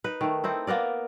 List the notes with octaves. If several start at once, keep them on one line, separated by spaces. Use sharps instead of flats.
D#4 B4
D#3 A3
C4 D#4 E4
A#3 B3 A#4 D5